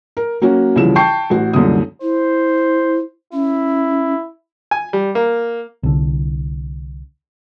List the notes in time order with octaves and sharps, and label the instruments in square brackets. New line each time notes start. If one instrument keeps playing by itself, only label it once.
[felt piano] A#4
F#3 A#3 C#4 F#4
C2 C#3 E3 F3 E7
G5 A5 C#6 G6 C7
A1 F#4
C2 F#2 A#2 D3 D#6
[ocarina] E4 [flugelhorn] C5
[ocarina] C#4 [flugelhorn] E4
[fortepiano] G#5
G3
A#3
[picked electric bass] C2 D3